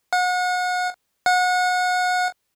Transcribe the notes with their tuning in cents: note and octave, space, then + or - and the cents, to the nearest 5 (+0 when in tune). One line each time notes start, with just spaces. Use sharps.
F#5 -35
F#5 -30